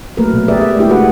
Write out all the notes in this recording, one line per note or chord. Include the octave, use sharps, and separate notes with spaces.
F#3 A3 A#3 A#4 B4
B2
G4 G#4 B4 D5 E5
E5
G#3 A3 D4 E4 G4 G#4
F#4 G#4 B4 F#5